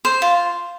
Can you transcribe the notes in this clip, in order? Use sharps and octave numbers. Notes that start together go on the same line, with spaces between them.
C5
F4